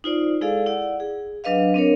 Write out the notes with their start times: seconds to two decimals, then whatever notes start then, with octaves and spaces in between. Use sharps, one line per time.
0.04 D#4 F4 C5 D5
0.41 G#3 E4 G#4 A4 D5 F5
0.66 E4 D5 F#5
1.00 G#4
1.44 F#3 D4 B4 D#5 F5
1.74 C4 D4 A#4 C#5